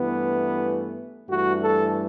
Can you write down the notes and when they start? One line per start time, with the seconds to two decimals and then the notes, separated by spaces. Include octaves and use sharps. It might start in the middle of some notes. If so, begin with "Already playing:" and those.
Already playing: G2 E3 A3 B3
1.28 G2 E3 A3 F#4
1.62 A4